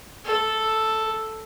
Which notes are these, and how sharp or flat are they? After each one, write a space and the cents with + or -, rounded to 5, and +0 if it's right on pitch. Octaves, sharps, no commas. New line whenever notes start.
A4 +0